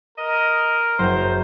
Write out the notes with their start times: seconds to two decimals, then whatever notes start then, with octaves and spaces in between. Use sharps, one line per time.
0.18 A#4 D#5
0.99 F#1 C5 A#5 G6